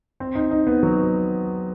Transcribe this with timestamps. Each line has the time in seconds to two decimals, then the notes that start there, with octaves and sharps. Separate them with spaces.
0.20 C4
0.35 D#4
0.51 D#4
0.67 B3
0.83 F#3